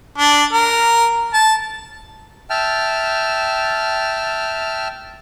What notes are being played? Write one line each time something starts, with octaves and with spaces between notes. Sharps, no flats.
D4
A#4
A5
E5 G5 A5 F6